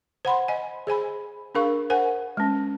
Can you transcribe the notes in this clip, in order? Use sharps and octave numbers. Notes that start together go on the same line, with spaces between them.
C5 F#5 B5 C6
D#5 G#5
G#4 C5 G#5 B5
D4 G#4 A#4 F5 C#6
A#4 C5 F#5 G#5
G#3 C#4